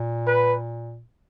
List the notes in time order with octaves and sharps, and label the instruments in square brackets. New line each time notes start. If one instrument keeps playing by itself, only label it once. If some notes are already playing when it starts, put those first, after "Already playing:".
Already playing: [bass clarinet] A#2
[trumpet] B4